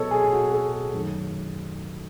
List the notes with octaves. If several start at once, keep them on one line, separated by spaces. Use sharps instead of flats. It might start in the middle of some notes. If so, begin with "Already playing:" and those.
Already playing: B2 F#3 B3 A4 C#5 D#5
G#4
F#4
A4
G#4
F#2 D#3 A3